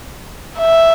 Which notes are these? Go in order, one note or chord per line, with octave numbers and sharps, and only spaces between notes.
E5